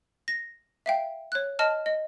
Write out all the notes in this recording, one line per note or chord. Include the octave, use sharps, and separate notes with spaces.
A#6
E5 F5 G5
C#5 F#6
D#5 A5 F6
D#5